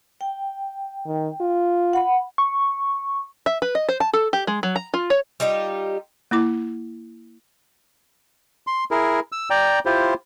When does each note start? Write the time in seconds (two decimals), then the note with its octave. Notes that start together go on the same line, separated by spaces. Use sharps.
0.21 G5
1.06 D#3
1.41 F4
1.93 F#5 B5
2.38 C#6
3.46 E5
3.62 B4
3.75 D#5
3.89 C5
4.00 A5
4.13 A4
4.33 G4
4.47 G#3
4.63 F#3
4.76 A#5
4.94 F4
5.10 C#5
5.40 G3 D#4 F4 G4
6.31 A#3 E4 D6
8.67 C6
8.91 E4 G#4 A#4
9.32 E6
9.50 D5 G5 A#5
9.86 E4 F4 G4 C5